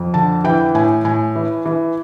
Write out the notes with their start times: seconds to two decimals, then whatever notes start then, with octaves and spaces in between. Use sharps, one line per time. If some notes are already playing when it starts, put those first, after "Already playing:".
Already playing: F2
0.14 D3 A5
0.44 E3 G5
0.74 A2 G#5
1.05 A2 G#5
1.36 E3
1.65 E3